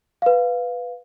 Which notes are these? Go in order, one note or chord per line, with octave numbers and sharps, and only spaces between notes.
B4 F5